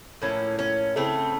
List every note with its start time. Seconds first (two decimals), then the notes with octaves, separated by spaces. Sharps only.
0.22 A2 F3 A#3 C#4
0.59 C#4
0.96 C#3 E3 A3 C4